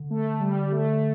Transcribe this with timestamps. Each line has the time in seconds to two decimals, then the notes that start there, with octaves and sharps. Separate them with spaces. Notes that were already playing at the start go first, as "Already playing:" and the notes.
Already playing: D3
0.10 A3
0.40 G3
0.72 A3